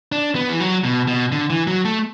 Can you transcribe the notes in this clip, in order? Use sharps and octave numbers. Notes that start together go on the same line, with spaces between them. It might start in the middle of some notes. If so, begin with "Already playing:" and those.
D4
B3
E3
F#3
B2
B2
D3
E3
F#3
A3